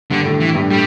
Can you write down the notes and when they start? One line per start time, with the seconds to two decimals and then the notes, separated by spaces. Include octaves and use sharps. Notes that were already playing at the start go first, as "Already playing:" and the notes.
0.10 G2 D3
0.25 A2
0.40 E3
0.55 G2
0.70 A2 G3